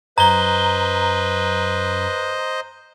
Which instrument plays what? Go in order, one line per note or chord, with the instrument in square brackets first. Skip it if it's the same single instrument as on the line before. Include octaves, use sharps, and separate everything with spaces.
[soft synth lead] F#2 [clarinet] B4 [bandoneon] C5 D#5 [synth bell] A#5 G7